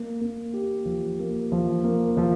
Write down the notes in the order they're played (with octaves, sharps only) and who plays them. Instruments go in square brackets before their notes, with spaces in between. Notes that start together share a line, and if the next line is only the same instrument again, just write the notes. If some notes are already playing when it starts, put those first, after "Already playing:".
Already playing: [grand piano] A#3
A#3
G4
F3
A#3
F3
A#3
F3